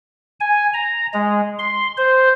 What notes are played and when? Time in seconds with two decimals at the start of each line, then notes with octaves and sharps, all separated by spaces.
0.40 G#5
0.74 A#5
1.14 G#3
1.59 C6
1.97 C5